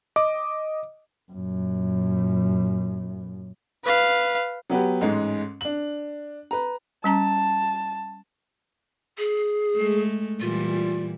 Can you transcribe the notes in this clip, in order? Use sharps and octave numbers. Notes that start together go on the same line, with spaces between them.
D#5 D6
F#2 A#2
B4 F5
F#3 B3 G4 B4
A1 G#2 G#3
D4 F#7
B4 A#5
G3 C#4 A5 A#5
G#4
G#3 A3
A#2 E3 G3 F4